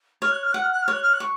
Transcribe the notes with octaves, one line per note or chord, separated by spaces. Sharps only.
C#5 F6
F#6
F6
F#5 F#6
F6
F#6
F6
C#5 F#6
F6
F#6
C#6